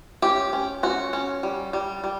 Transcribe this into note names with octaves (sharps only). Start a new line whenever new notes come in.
C#4 G4
C#4
C#4 F#4
C#4
G3
G3
G3